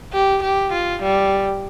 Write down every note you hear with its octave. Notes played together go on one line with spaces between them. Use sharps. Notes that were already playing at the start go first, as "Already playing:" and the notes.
G4
G4
F4
G3